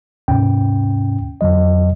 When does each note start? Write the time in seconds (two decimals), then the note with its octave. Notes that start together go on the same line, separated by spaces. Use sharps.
0.28 D#2 G#2 C3 C#4 G5
1.41 F2 D3 F#3 D#5